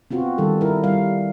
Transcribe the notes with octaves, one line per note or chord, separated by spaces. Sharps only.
B3 C4 F4 F#4
D#3 G3 A4
E4 A#4
G3 F5